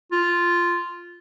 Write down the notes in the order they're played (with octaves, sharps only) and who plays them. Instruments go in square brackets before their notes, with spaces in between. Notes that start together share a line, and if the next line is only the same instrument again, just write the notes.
[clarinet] F4